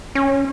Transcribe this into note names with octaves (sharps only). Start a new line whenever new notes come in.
C#4